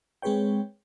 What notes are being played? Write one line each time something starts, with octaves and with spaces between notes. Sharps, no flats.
G#3 C4 G#4 B4 C#5 G5